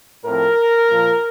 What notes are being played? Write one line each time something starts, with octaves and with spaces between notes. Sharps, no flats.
A2 F3 C4 A#4
A#2 F3 A#3